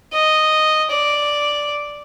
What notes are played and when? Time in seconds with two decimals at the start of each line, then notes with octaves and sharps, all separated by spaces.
0.13 D#5
0.90 D5